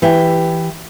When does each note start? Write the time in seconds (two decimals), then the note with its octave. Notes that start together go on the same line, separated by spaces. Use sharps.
0.02 E3 G4 E5 G5